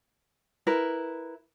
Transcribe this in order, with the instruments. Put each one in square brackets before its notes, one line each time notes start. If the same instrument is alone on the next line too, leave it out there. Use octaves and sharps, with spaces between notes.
[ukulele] E4 A#4 B4